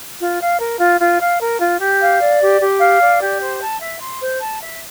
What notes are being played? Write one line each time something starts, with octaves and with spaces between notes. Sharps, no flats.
F4
F5
A#4
F4
F4
F5
A#4
F4
G4
F5
D5
G4
G4
F5
D5
G4
C5
A5
E5
C6
C5
A5
E5